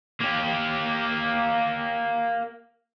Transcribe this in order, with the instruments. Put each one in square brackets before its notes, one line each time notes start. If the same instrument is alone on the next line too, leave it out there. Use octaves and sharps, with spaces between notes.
[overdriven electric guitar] A#3 G4